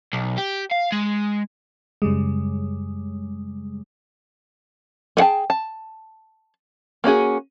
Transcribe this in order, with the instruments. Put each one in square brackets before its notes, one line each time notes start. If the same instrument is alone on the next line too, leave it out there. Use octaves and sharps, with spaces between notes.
[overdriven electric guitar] B1
G4
F5
G#3
[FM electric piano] F#2 C#3 G3 G#3
[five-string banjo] B3 G#4 F#5 G5 A5
A5
A#3 C#4 F#4 G#4